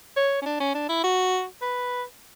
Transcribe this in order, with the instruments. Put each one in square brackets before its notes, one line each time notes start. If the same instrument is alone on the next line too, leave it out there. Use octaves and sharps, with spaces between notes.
[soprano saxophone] C#5
C#4
D4
C#4
D4
E4
F#4
B4